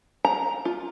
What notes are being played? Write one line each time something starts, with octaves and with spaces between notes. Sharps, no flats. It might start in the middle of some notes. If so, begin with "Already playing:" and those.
A#5
F4